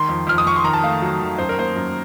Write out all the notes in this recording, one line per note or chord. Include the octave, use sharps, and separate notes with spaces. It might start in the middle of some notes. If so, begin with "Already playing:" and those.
Already playing: D#3 C6
F2
F2 F6
D#6
F2 C#6
C6
D#3 A#5
A5
A3 F5
F#3
D#3
F#2 C5
A#4
A#3 C5
F#2